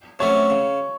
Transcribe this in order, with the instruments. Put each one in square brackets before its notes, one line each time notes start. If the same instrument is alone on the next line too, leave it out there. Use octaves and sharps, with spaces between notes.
[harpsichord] C3 F#3 A3 C#4 [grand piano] C#5
[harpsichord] C#3